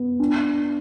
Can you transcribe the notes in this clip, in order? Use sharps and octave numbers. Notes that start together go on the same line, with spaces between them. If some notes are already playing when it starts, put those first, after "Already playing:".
Already playing: B3
D4